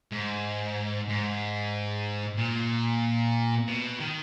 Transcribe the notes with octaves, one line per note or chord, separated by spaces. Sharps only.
G#2
G#2
A#2
B2
D#3